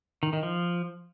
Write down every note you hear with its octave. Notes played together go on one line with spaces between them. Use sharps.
D#3
D#3
F3